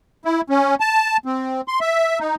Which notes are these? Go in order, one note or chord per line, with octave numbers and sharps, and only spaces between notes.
E4
C#4
A5
C4
C6
E5
D#4